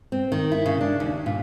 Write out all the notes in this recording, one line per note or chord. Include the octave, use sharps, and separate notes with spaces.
C4
D#3
E4
C#3
D4
D#2
A#2